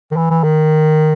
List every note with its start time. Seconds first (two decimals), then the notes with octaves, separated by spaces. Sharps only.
0.11 D#3
0.16 E3
0.30 E3
0.43 D#3